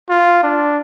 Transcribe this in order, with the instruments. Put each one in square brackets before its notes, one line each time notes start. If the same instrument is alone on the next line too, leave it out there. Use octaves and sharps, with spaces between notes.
[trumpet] F4
D4